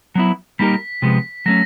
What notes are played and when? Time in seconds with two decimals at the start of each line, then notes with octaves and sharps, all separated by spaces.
0.15 F#3 B3 E4
0.59 G3 A#3 D#4 G4 A#4 B6
1.02 C3 F3 G#3 B3
1.46 F#3 A3 C#4 A#6